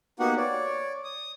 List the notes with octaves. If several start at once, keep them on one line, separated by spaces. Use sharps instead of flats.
A#3 B3 D#4 F#4 G4 F#5
C#5 D5
D#6